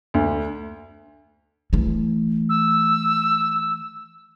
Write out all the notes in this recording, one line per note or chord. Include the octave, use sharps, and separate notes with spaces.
D2
E3 A3
E6